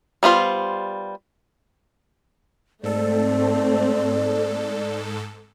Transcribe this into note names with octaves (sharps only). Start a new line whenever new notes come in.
G3 B3 F4 C5
G#2 A3 C4 A4 D5